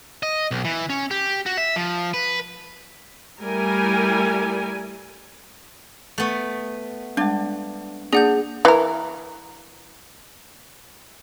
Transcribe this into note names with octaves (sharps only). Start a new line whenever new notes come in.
D#5
B1
E3
C#4
G4
F#4
E5
F3
B4
G3 A3 E4 A#4 G#5
A3 B3
G3 G#3 D4
A#3 D4 G#4 D5 F#5 D#6 G6
E3 A#4